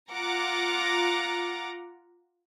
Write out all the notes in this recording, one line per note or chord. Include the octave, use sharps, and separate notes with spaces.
F4 F#5 A#5 D6